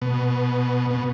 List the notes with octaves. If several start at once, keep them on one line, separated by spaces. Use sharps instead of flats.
B2
B2